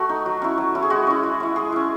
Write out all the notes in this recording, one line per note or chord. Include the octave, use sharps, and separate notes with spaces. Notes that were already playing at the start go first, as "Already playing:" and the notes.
Already playing: A3 F#4
D#4
F#3
C#4 E4
F#3
C#4 E4
G#4
G#3 F#4
C#4 E4
G#3
C#4 E4
G#3 G#4
C#4 E4